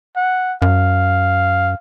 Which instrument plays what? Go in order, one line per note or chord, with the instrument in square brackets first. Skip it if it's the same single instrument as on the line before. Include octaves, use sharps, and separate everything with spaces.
[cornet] F#5
[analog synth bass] F#2 [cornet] F5